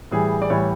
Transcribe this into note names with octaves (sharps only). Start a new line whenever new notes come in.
A2 E3 G3 G#4
D5
A2 E3 G3 C#5